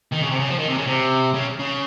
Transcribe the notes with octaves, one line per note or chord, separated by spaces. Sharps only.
D#3
C#3
C3
C#3
F3
D#3
C3
C#3
C3
C#3
C#3